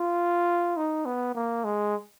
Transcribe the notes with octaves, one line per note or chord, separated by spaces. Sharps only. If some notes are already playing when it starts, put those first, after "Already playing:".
Already playing: F4
D#4
B3
A#3
G#3